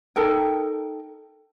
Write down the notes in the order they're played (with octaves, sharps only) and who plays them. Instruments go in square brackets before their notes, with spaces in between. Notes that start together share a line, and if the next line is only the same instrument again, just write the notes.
[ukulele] D#4 A4 A#4 G5